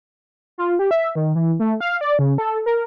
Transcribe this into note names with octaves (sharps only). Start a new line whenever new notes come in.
F4
G4
E5
D#3
E3
A3
F5
D5
C#3
A4
A#4